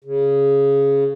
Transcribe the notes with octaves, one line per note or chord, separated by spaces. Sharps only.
C#3